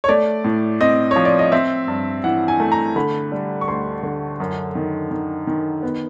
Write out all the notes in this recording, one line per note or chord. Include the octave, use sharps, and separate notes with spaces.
C#5
A3 D5
A2
C4 D#5
F3 C#5
D5
D#5
C4 E5
G2
E3 F#5
G#5
A3
A#5
D3 B5
G3
C#6
D2 C6
D3
F#2
D#3
D#3
D#3
B3